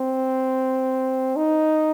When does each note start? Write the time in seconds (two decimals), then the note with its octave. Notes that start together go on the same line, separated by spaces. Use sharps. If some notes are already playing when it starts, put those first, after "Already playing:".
Already playing: C4
1.36 D#4